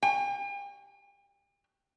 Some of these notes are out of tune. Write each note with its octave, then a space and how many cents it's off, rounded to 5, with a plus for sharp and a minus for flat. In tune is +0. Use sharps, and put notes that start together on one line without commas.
G5 +45